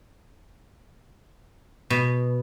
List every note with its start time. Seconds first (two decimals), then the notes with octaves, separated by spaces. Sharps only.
1.90 B2